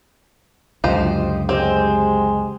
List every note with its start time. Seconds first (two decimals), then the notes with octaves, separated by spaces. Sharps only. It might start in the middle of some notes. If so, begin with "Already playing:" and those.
0.84 C#2 F#2 D3 F3 G4 C5 D#5
1.49 G#3 C4 G4 C5 D#5